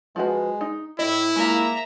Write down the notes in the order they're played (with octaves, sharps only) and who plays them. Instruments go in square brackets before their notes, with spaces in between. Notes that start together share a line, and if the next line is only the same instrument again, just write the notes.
[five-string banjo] F3 F#4 B4 [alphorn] G#3
[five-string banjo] D#4
[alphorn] A2 [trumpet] E4 [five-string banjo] D#5
[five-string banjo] G#3 F4 [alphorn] A#3 [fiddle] E5 A#5